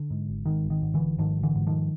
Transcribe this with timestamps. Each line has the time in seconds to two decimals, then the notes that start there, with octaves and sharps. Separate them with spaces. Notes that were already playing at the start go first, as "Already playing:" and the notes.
Already playing: D3
0.10 G#2
0.29 G#1
0.45 G#2 D#3
0.64 G#1
0.70 D#3
0.82 G#2
0.94 D3 E3
1.00 G#1
1.18 G#2 D#3 F3
1.37 G#1
1.43 D3 E3
1.55 G#2
1.67 D#3 F3